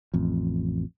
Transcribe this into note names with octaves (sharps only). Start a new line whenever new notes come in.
A1 F2